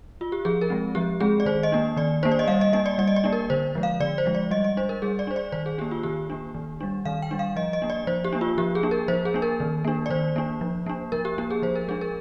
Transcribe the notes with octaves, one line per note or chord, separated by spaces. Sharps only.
F4
G4
F3 G#4
A#4
G#3 C4
F3 G4
G#3 C4 G#4
D5
D#3 C5
D#5
A#3 D4
D#3 D5
A#3 D4 C5
D5
D#5
G3 F5
D#5
A#3 D4 D#5
D5
G3 D5
D#5
D5
A#3 D4
A#4
D3 C5
F3 G#3
F5
D3 D5
C5
F3 G#3
D5
G3 D#5
D#5
D4 C5
A#4
G3 G#4
D5
D4 C5
D5
D#3 C5
G#4
A#3 D4 G4
F4
D#3 G4
A#3 D4
D#3
G3 D4
D#3 F5
G5
G3 D4
F5
F3 D#5
D#5
A#3 D4
D5
F3 C5
G4
A#3 D4
F4
F3 G4
G#4
A#3 D4
A#4
F3 C5
G#4
A#3 D4
A#4
D#3
A#3 D4
D5
D#3 C5
A#3 D4
F3
A#3 D4
F3 A#4
G4
A#3 D4 G4
G#4
F3 C5
A#4
G#3 D4 G#4
A#4